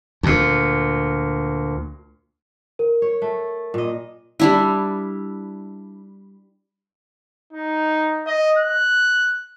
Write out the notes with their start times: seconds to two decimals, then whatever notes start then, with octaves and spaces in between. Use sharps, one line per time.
0.23 D2 A#2
2.79 A#4
3.02 C#5
3.22 A3
3.74 A#2 D#5
4.40 G3 D4 E4
7.53 D#4
8.27 D#5
8.58 F#6